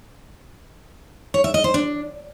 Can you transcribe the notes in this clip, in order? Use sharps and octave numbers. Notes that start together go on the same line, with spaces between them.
C#5
E5
D#5
C5
D4